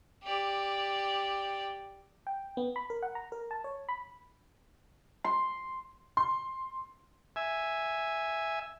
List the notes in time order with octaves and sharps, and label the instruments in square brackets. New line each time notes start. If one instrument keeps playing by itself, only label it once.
[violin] G4 D5
[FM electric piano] G5
B3
B5
A#4
F#5
A#5
A#4
A5
C#5
B5
[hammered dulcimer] C6
[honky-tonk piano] C6
[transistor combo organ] E5 G#5